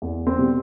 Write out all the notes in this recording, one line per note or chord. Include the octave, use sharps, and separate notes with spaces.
E2
C4
B2 G3